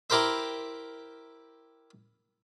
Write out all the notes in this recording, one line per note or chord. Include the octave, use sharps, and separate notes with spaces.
E4 G4 A#4 C5 E5